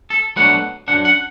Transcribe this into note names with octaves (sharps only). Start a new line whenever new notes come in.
A4
B2 F#3 A3 D4 F#5
F#2 E3 D4 F#5
F#5